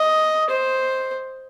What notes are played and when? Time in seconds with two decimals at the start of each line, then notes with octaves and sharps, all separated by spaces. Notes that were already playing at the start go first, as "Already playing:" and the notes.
Already playing: D#5
0.50 C5